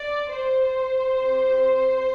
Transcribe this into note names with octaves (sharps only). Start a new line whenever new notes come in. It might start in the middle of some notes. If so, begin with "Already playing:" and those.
Already playing: D5
C5
C4 G4